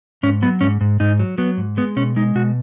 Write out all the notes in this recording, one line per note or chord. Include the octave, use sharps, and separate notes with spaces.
G#2 C#4
F#3 B3
G#2 C#4
G#2
G#2 D#4
F#3
F#3 B3
G#2
G#3 B3
B2 C#4
G#3 D#4
B2 F#4